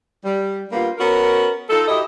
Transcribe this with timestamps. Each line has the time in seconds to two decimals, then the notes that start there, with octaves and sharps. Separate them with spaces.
0.24 G3
0.71 G3 A#3 B3 D4 F4
0.98 B3 C#4 F#4 A#4
1.69 D#4 F4 A4
1.88 E4 F#4 G4 D#5